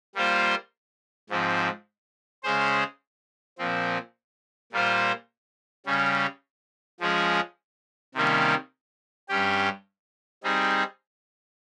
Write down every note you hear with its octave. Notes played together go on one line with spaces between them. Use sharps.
G3 A#3 F4 C5
G#2 F3 C4
C#3 G#3 C#4 G#4 C5
A#2 F3 C4
A#2 G3 A#3 F4 C5
C#3 G3 C#4
F3 G#3 C#4 G#4
C3 D#3 G3 A#3 C#4
G2 G3 C#4 G4
G3 C4 D#4 G#4